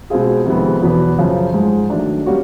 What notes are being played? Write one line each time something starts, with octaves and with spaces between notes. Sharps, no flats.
B2 G#3 C4 F4 G#4
F2 C3 D#3 G#3 B3
E2 B2 F#3 B3
F#2 C#3 F3
G#2 F3 G#3
D#3 F#3 A3 D4
G3 A#3 C#4 F#4